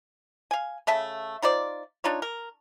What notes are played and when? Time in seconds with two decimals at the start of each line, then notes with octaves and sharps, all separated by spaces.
0.51 F5 G#5
0.87 C#3 A3 E5 A5
1.42 D#4 F4 C5 D5
2.04 D4 D#4 F4 C#5
2.22 A#4